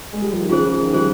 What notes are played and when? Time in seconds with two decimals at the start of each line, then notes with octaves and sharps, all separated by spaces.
0.13 G#3
0.22 G3
0.31 F3
0.40 D#3
0.49 C#3 F4 G#4 C5
0.64 F3
0.79 D#3
0.93 G3 F4 G#4 C5